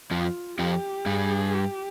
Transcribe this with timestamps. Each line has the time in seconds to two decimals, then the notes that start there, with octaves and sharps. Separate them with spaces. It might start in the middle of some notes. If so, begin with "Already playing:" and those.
0.11 F2 F3 F4
0.58 F2 F3 G4
1.06 G2 G3 G#4
1.54 G4